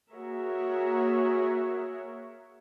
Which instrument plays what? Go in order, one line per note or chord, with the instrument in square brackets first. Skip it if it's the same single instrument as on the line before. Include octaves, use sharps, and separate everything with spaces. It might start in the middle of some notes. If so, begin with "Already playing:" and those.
[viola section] A#3 F#4 G#4 A#4 C#5 E5